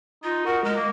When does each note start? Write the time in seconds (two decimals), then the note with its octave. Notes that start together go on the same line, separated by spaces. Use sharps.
0.24 D#4 F4
0.46 F#4 A#4
0.64 G#3 A#4
0.76 A#3